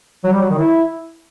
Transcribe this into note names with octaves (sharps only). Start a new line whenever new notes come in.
F#3
G3
F#3
D#3
E4